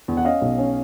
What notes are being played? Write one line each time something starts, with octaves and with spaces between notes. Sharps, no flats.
E2
F#5
C#4 D#5 F5
B1
C#4